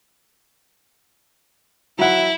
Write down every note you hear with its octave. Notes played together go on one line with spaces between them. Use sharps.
F#3 E4 E5 F#5